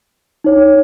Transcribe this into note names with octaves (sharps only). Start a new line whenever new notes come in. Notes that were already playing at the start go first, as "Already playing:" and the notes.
D#4 C#5